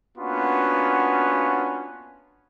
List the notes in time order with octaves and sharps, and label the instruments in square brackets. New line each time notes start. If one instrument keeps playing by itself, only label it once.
[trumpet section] A#3 B3 C#4 D4 F4 F#4